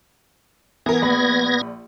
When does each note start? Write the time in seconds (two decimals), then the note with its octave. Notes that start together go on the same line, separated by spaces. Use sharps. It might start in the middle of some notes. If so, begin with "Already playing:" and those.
0.86 E3 B3 A#4 G#6 A#6
1.02 A#1 B5